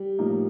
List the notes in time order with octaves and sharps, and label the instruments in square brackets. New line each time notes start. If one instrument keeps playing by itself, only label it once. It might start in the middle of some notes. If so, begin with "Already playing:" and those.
Already playing: [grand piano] G3
[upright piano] A2 F3 A#3 D#4